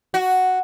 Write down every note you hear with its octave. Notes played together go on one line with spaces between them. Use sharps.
F#4